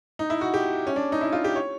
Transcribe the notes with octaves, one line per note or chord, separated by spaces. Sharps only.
D#4
E4
F#4
G4
C#4
D4
D#4
E4
F4
G4
C#5